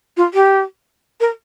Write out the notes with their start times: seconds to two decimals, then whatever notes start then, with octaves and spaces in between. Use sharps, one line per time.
0.17 F4
0.33 G4
1.20 A#4